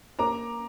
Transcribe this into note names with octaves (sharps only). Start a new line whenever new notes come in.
A#3 A#5 D6